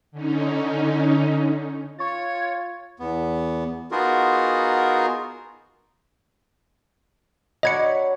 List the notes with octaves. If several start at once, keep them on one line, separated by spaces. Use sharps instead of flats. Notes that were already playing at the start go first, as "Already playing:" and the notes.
D3 C#4 D#4
F4 C#5 C#6 A6
E2 B3
B3 D#4 F4 F#4 G#4 A#4
F#3 D4 D#5 B5 G#6 C#7